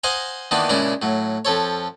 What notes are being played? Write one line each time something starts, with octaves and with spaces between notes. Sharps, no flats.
C5 D#5 F5 F#5 G#5 A#5
D#3 E3 A#3 B3 D4
A#2 C#3 G#3 D4 E4
A2 F#3
F2 F3 A4 C#5